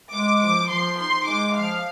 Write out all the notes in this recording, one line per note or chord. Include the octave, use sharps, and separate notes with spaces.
G#3 D6
F3 D6
F3 C6
D#4 C6
G#3 D6
F3 F5